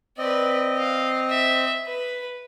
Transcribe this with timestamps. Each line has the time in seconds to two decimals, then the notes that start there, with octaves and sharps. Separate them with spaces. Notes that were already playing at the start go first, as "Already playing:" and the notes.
0.18 C4 B4 D5 D#5
0.77 F5
1.30 E5
1.86 B4